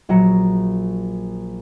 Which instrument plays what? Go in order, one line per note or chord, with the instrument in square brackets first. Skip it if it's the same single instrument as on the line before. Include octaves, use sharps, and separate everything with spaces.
[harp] A#1 F#3 A#5 C#7